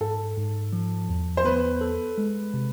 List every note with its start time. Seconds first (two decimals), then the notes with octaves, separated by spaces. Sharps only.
0.01 G#2 A4
0.37 G#2
0.73 F3
1.09 E2
1.37 C5
1.45 B3 B4
1.81 A4
2.18 G#3
2.54 C3